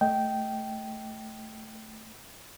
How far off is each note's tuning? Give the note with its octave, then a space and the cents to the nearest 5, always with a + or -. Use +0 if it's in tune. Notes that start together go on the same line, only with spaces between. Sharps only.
A3 +0 D#5 +15 G5 -10